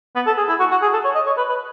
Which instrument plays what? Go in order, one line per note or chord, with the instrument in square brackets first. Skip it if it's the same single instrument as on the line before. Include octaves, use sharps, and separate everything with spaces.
[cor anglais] B3
A4
G#4
E4
F#4
F#4
G#4
A4
C#5
D#5
C#5
B4
B4